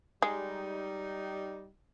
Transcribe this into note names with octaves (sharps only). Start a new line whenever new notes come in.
G3 G#3 D#4